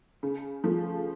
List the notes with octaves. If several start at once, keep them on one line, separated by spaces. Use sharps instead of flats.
C#3
F3 A3